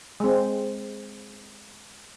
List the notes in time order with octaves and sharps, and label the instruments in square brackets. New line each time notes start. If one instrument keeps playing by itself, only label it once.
[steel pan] G#3 C4